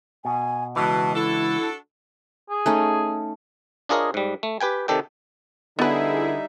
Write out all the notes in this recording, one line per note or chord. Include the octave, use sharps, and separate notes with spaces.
B2 G#5
C#2 B2 E3 A5
D4 E4 F#4 A4
G#4
A3 C#4 D#4
D4 F4 G#4 A#4 C#5 D#5
G#2 G3
A3
G4 B4 G5 G#5
C3 D#3 A4 D5 G5
D3 G3 B3 D#4 E4 G#4 B4 E5